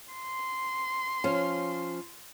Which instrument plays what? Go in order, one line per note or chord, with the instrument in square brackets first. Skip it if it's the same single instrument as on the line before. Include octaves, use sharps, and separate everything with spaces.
[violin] C6
[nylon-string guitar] F3 C#4